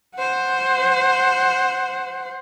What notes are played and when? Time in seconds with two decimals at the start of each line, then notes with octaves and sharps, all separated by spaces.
0.16 C5 F#5